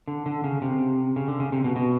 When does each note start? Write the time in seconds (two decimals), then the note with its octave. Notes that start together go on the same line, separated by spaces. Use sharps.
0.07 D3
0.26 D3
0.44 C#3
0.62 C3
1.16 C#3
1.28 D3
1.40 C#3
1.52 C3
1.64 B2
1.76 B2